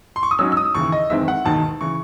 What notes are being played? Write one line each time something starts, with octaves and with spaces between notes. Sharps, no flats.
C6
C#6
D#6
G#2 F#3 C#4 E6
E6
D#6
D#2 C#3 E3 C#6
D#5
F#1 E2 D#3 G#3 C4 E5
F#5
E1 D#2 D#3 A5
C#3 E3 C#6